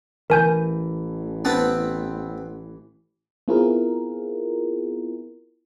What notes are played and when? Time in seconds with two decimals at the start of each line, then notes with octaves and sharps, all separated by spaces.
0.30 A1 E3 A#4 G#5 G6
1.45 B3 C4 A5
3.48 B3 C4 E4 F4 G#4 A#4